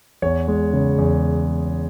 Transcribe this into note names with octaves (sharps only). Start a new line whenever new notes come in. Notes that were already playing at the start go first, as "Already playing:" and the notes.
E2 C#5
G#3
C#3
E2